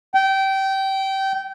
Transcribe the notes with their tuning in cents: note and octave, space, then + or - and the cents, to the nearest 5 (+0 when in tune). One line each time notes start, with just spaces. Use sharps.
G5 -20